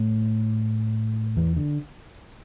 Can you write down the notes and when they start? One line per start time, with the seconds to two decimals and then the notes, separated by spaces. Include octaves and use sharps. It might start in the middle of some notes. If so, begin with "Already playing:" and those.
Already playing: A2 A3
1.37 E2 E3
1.57 D3